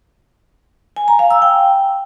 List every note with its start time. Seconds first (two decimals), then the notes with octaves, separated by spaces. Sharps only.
0.97 G#5
1.08 A#5
1.19 F5
1.31 E6
1.42 G5